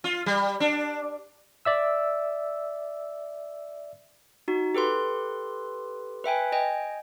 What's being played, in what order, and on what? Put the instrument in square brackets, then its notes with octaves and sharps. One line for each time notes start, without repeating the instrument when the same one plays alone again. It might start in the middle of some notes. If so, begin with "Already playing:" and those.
[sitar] F4
G3
D4
[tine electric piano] D5 E5 E6
[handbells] D#4 F#4
G4 A4 B4 C6
B4 E5 G5 G#5
D#5 G5 G#5